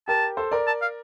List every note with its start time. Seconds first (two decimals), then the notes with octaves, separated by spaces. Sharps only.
0.08 G4 A#4 A5
0.37 A4 C5
0.52 A#4 D5
0.67 A5
0.82 F5